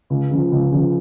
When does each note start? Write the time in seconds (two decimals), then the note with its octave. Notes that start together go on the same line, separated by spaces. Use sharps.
0.10 C#2
0.30 C#3 F3
0.52 C#2
0.71 C#3 F3